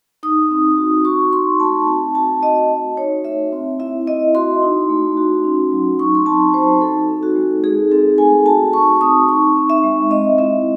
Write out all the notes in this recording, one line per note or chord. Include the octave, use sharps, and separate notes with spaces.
D#4 D#6
C4
F#4
F#4 C#6
D#4 C6
A3 A5
C4 A5
F#4 A5
F#4 D#5
F#4
D#4 C#5
A3 E5
C4
E4 E5
E4 D#5
F#4 C6
D#4
A3
F#4
C#4
F#3
D#4 C#6
C6
C4 A5
F#4 C5
D#4 A4
C4
F#4
G#3
D#4 G#4
C4 A4
A3 G#5
F#4 A5
D#4 C#6
C4 D#6
D#4 C#6
C4
E5
G#3
C4 D#5
E4 E5